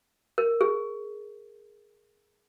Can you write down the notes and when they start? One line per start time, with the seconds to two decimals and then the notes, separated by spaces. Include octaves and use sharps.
0.38 A#4
0.61 G#4